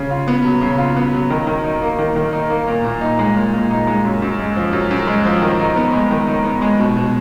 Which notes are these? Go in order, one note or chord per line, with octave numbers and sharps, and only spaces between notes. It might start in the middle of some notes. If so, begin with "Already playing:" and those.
Already playing: C#3
F4
B3
F#3
C#3
F4
B3
F#3
D#3
D#3
D#4
A#3
D#3
D#3
D#4
A#3
A#2
A#2
D#4
G#3
A#2
A#2
D#4
G#3
F#2
F#2
G#3
F3
F#2
F#2
G#3
F3
D#3
D#4
B3
G#3
D#3
D#4
B3
G#3
B2
B2